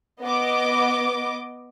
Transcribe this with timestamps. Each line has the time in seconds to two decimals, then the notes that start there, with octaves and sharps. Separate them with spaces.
0.23 B3 D#5 D6